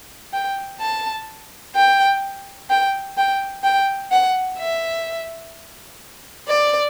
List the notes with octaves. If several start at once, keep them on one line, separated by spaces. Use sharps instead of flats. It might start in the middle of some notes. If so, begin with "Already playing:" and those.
G5
A5
G5
G5
G5
G5
F#5
E5
D5